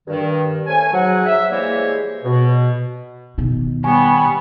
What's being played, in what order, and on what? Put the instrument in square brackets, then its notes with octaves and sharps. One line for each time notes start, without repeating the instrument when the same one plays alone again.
[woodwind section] G2 D#3
A3 C#4 C5 G#5
G#2 F#3 F#5
E5
E3 G3 G#3 A#3 C5 C#5
B2
[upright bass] B2 D#3
[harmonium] G3 C#5 [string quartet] B3 [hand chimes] G#5